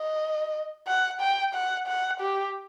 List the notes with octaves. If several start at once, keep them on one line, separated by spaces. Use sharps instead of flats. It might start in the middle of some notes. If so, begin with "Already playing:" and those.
Already playing: D#5
F#5
G5
F#5
F#5
G4